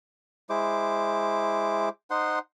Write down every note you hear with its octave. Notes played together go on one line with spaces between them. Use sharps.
G#3 E4 C5 D6
D#4 C5 F#5 C6